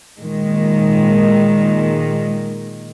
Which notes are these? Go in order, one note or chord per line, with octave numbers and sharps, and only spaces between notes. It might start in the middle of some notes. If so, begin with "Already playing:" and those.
A#2 D#3 G#3